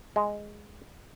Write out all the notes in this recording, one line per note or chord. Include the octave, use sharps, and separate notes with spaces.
G#3